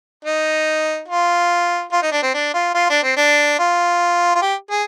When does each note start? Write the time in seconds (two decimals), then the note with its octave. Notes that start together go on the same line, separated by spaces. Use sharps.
0.25 D#4
1.08 F4
1.92 F4
2.03 D#4
2.12 D4
2.23 C4
2.34 D4
2.54 F4
2.75 F4
2.90 D4
3.03 C4
3.17 D4
3.59 F4
4.35 F4
4.42 G4
4.71 G#4